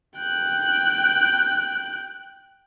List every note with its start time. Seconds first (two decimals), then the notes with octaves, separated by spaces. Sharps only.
0.18 G5 F#6